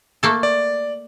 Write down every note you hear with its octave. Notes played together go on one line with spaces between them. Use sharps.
A3 A#3 A4
D5